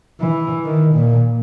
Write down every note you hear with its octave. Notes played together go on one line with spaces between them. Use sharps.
E3
D#3
A#2